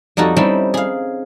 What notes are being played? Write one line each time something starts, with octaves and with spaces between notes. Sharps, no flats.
F2 G3 D#4 F#4 A4
G3 C4 C#4 D#4 E4
G#4 F5